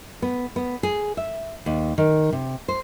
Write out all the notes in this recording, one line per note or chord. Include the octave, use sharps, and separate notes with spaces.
B3
B3
G#4
E5
D#2
D#3
C3
C5